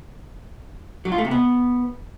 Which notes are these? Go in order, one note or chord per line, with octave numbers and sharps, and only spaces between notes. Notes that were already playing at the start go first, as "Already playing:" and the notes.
F#3
F4
A3
C3
B3